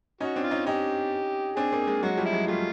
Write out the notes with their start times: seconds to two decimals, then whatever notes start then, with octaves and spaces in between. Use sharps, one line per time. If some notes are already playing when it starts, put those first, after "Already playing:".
0.20 C#4 D#4 F#4
0.36 C4 D4
0.44 F4
0.51 C#4 D#4
0.67 C#4 D#4 G4
1.57 C4 D4 G#4
1.72 A#3 C4
1.87 G#3 A#3
2.03 F#3 G#3 F#4
2.17 F3 G3
2.25 E4
2.33 F#3 G#3
2.48 G3 A3 F4